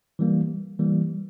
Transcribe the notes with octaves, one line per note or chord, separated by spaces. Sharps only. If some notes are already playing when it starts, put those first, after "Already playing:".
E3 G3 A#3
E3 G3 A#3